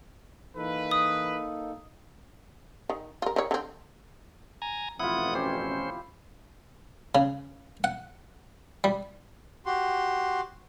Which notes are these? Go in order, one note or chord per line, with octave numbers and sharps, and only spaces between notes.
E3 A#3 D#4 A4 B4
D#6
D#3
F4 A#4
D#3 C#5
D3 C4
G#5 A#5
A1 F2 B2 E4 F4 F#5 D#6
C#4 G4 C5
C#3
F#5
G3
F#4 G4 C6